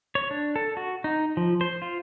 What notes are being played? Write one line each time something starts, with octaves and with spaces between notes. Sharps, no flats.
C#5
D4
A4
F#4
D#4
F3
C5
F4